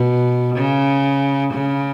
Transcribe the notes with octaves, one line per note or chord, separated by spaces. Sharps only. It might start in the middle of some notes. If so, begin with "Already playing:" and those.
Already playing: B2
C#3
C#3